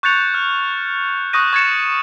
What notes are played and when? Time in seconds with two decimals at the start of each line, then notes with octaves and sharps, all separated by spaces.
0.03 C#6 F#6 G6 A6 C#7 F7
0.34 F6
1.33 C#6 D#6 F#6 A#6 D#7
1.53 C#6 G#6 A6 C#7 E7